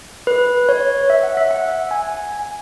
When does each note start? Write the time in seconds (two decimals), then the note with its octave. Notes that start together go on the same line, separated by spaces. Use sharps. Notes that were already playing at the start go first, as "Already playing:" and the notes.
0.27 B4
0.69 C#5
1.10 E5
1.23 F#5
1.37 E5
1.51 F#5
1.91 G#5
2.32 G#5